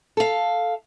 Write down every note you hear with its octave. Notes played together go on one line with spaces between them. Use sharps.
A4 F5